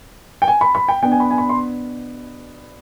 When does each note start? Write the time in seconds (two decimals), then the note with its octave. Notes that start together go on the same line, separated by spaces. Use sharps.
0.42 G5
0.48 G#5
0.61 B5
0.75 B5
0.88 G5
1.02 B2 B3 D4 G5
1.12 G#5
1.20 B5
1.30 G#5
1.38 B5
1.49 C6